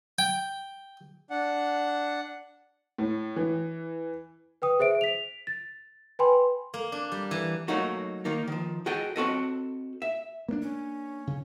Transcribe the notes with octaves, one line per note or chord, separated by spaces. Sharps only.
G5
D4 F#5
A2
E3
B4 G5 D#6
G#4 C5 E5 D7
B6 F7
A6
B4 G5 G#5 B5 C6
A#3
D4
G3
E3
F#3 A3 A#3 D#4 F#4
D#3 A#3 D#4
D#3 F3
F#4 G#4 A4 D#5 G5
C4 F#4 A4 D#5
E5
A#3 B3 D4
C#4
C#3